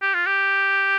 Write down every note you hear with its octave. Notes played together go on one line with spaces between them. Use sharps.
G4
F4
G4